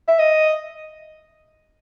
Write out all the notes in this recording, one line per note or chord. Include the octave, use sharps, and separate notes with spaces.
E5
D#5